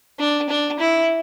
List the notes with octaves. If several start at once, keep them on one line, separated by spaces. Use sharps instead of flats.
D4
D4
E4